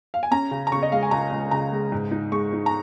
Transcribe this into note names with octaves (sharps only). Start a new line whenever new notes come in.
F5
G#5
C#4 A#5
C#3
A#5
C#3 C#6
D#5
G#3 F5
G#5
C#2 A#5
C#2
C#3 A#5
G#3
G#2
D#4
G#3 C#6
D#4
A#5